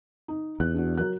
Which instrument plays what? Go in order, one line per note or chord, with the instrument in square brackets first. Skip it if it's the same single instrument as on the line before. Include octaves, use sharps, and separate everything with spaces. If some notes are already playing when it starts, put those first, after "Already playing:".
[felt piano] D#4
[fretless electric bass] E2 [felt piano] F#6
[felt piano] D4 F#4
F#3 A#4 F#6